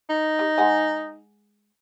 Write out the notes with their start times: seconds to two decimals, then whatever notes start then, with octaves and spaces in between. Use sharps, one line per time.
0.09 D#4
0.39 G4
0.58 G#3 F#5 G#5